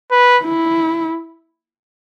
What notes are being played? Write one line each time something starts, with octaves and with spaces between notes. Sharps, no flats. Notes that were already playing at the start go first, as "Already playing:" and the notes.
B4
E4